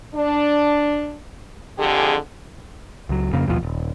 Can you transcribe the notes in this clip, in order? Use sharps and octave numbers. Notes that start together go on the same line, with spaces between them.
D4
F2 D3 G4 G#4
C#2 F#3
F2 C#3 A#3
A1 D#2 B2 F3
D#1